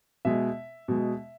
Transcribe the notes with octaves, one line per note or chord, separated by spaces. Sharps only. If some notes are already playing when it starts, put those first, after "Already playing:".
B2 G#3 E5
B2 G#3